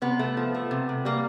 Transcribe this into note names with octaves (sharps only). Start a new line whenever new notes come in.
C3 B3
A3
F3
A3
C3
C3
G3 A#3